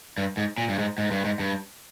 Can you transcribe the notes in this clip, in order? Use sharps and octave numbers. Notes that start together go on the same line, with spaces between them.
G2
G#2
A#2
G2
G#2
G#2
G2
G#2
G2